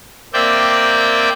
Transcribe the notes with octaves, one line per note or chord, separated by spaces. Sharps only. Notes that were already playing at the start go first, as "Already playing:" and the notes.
A#3 C4 D5 E5 G5